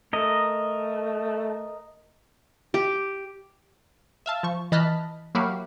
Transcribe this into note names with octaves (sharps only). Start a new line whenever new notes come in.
A3 A#4 D#5
G4
E5 F5 A5
F3 C#6
E3 D#5 A5 B5 F6 F#6
F#3 A#3 E4 F#4 G4 F5